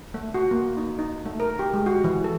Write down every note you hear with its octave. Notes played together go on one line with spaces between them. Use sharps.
A3
F#4
A#3
D#4
D#4
A3
A#4
G4
G#3
F#4
E3
A4